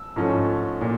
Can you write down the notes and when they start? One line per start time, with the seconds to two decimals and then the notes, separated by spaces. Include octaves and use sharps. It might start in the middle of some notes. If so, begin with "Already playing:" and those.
Already playing: E6
0.16 G#2 F3 A3 C#4
0.81 A#2